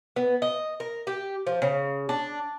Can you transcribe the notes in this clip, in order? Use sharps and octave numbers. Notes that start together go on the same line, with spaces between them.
B3
D#5
A#4
G4
F3
C#3
D4